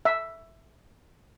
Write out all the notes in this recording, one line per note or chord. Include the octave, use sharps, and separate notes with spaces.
E5